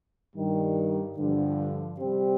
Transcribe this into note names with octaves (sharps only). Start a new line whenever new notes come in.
G2 D#3 G3
G2 D3 F3
C3 G3 C4 G4